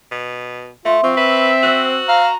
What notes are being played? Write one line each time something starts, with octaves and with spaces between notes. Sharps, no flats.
B2
A3 F4 E5 C6
F3 C4 C#6
B4 E5
F#4 C5 E6 F#6
F5 A#5